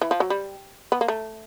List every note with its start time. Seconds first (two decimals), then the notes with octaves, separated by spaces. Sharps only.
0.02 E3
0.11 F3
0.20 F#3
0.30 G3
0.92 B3
1.01 A#3
1.08 A3